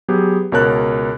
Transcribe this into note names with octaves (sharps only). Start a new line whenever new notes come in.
F#3 B3 G4 G#4
C#2 B2 A#4 C#5 A5 F#6